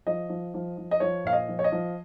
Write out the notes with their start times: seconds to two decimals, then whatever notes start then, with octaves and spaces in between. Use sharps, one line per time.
0.06 F3 D#5
0.29 F3
0.54 F3
0.78 F3
0.91 D#5
1.00 F3 C#5
1.25 A#2 F5
1.33 D#5
1.48 F3
1.59 C#5
1.64 D#5
1.72 F3